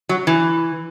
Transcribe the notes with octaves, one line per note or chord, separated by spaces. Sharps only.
F#3
E3